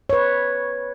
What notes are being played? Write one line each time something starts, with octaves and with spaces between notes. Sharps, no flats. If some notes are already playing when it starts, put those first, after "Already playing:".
B4 C#5